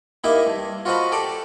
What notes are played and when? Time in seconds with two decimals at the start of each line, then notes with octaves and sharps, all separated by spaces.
0.24 A#3 D#4 E4 G4 D#5 E5
0.47 G2
0.85 F4 F#4 C5 D#5 A5 B5
1.12 G4 A4 D5 G5 A5